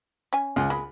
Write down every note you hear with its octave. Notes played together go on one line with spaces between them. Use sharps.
C#4 G#5
C#2
G#3 B5